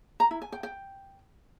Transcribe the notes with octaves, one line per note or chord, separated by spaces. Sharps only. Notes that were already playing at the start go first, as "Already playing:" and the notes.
A#5
E4
G#5
G5
G5